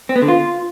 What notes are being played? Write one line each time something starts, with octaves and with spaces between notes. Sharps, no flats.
C4
B3
D3
F4